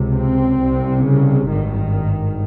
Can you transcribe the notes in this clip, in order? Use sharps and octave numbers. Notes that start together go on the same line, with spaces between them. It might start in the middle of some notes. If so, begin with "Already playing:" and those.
Already playing: C#2 C3
C4
C2 C3
C#3
G#1 G2 D#3